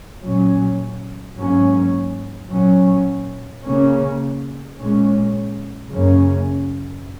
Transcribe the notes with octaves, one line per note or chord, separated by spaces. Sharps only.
A#2 F#3 C#4
G#2 F#3 A#3 C#4
A#2 F#3 C#4
C#3 A#3 C#4
A#2 G#3 C#4
F#2 C#3 A#3 C#4